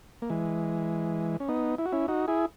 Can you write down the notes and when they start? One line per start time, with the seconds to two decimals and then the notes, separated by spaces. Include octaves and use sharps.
0.22 A#3
0.30 E3 G#3
1.40 C#4
1.48 B3 D#4
1.78 E4
1.85 F#4
1.92 C#4 E4
2.08 D#4 F#4
2.28 E4 G#4